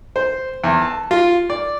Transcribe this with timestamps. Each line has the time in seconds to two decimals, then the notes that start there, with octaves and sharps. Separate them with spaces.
0.16 C5
0.64 E2
0.82 A5
1.11 F4
1.50 D5